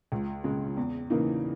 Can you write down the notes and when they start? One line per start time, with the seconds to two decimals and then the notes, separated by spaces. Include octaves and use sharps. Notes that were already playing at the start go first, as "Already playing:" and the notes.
0.12 C#2
0.44 C#3 G#3
0.77 E2
1.10 C#3 E3 A#3 D#4